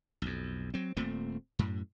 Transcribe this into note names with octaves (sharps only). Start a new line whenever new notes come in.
B1 F2
F#3 C4
D#1 A#2 A3 C4
F#2 A2